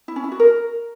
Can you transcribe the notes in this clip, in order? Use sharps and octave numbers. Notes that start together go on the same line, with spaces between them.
E4
C#4
E4
F#4
A#4